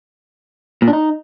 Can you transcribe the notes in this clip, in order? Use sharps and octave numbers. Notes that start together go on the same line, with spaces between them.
A#2
D4
D#4